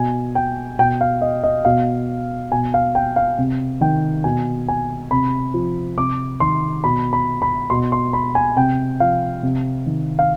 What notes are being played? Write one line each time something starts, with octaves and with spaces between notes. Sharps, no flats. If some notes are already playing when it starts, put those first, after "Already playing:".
Already playing: B2 G#5
G5
B2 G5
F5
D#5
D#5
B2 F5
B2 G#5
F5
G5
F5
C3
D#3 G5
B2 G#5
G#5
C3 B5
F3
C3 D6
D#3 C6
B2 B5
B5
B5
B2 C6
C6
B5
G#5
C3 G5
F3 F5
C3
D#3
F5